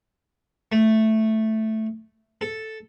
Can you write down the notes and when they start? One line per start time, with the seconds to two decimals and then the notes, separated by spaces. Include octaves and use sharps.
0.72 A3
2.41 A4